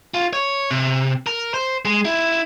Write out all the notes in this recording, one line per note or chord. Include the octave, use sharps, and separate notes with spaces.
F4
C#5
C3
A#4
C5
G#3
E4